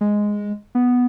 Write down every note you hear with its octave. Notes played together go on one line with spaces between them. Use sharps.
G#3
B3